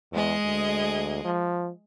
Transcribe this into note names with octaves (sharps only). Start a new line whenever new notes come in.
E2 G#3 G#4 D#5
D2
F3